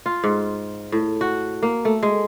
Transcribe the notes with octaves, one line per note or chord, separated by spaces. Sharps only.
F4
G#2
A2
F#4
A#3
A3
G#3